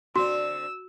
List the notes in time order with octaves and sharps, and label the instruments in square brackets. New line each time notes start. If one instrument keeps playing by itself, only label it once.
[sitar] D3 C4 [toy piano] F#4 [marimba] C6 [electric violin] E6